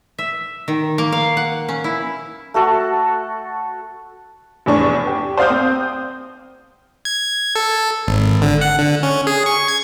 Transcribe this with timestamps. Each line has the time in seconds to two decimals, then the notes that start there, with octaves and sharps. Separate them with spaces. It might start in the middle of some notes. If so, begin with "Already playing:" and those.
0.18 E5
0.68 D#3
0.98 A#3
1.12 F5
1.37 F#5
1.69 C#4
1.84 E4
2.54 A3 F#4 A4 F#5
4.66 F1 E2 D4 C#6
5.07 G4
5.37 C5 D5 F5 D#6 G6
5.50 C4
7.05 G#6
7.55 A4
8.08 G#1
8.42 D3
8.61 F#5
8.79 D3
9.03 C#4
9.27 G#4
9.46 C#6
9.68 G#6